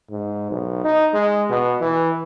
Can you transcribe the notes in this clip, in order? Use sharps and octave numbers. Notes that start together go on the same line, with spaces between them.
G#2
B1
D#4
G#3
B2
E3